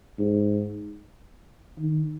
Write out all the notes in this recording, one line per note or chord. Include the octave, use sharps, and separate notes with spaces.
G#2
D#3